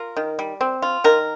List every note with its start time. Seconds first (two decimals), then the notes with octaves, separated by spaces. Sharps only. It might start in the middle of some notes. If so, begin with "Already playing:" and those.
Already playing: F4 A#4
0.17 D#3
0.39 G3
0.61 C4
0.82 F4
1.04 D#3 A#4